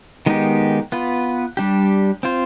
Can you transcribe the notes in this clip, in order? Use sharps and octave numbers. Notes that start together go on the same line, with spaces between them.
D#3 G#3 B3 D#4 G4
B3 F4 B4
G3 D4 G4
C4 F4 C5